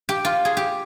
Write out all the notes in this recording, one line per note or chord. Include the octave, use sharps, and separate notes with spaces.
G4
F4
G#4
G4